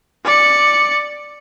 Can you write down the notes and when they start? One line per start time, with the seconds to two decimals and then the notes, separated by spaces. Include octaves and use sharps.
0.25 D5 C#7